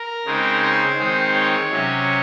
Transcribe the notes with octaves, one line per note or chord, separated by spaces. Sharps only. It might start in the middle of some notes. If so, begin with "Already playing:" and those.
Already playing: A#4
C#3 G#3 C4 D#4
C5
D#3 G#3 C4 D#4
C#5
C3 F#3 C#4